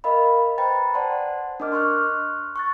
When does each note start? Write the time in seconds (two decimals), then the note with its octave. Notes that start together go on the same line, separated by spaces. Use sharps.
0.04 A#4 D#5 F5 B5
0.58 B4 C5 G5 A#5 B5 A6
0.94 C5 D5 F#5 A5 C6
1.60 D4 A#4 D#5 D6 F6
1.72 C6 C#6 F6 F#6
2.56 C#6 F#6 A6